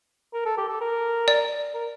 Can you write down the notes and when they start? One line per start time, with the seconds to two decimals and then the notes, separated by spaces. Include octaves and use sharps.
0.33 A#4
0.45 A4
0.57 G4
0.68 A4
0.81 A#4
1.28 D5
1.74 A#4